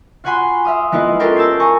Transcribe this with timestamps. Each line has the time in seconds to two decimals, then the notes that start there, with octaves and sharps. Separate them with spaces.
0.24 F4 F#4 F#5 G#5 B5 C6
0.65 E5 F5 D#6
0.92 G#3 B3 E4 F4 B4 D#5
1.20 C#4 F4 G4 A4 A#4 G5
1.36 A5 E6 G6 G#6 C7
1.60 G#5 A#5 C#6